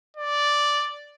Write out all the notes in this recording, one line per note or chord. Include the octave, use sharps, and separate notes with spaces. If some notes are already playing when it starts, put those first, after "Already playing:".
D5